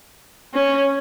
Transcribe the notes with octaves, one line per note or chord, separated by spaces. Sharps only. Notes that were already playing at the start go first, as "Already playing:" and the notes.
C#4